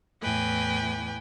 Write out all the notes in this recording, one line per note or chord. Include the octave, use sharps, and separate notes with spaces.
E2 A2 B4 G5 G#5